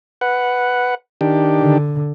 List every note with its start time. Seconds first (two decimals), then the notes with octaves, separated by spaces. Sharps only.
0.21 B4 F#5
1.21 D#3 D4 G4
1.61 D3